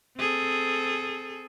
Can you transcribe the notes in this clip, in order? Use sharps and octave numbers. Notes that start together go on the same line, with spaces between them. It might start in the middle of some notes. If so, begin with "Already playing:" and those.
C4 G#4 A4